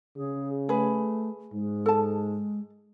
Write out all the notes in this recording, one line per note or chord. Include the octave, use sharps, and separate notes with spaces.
C#3 G#4
A3 G#4 B4
G#2 G#3
A4 A5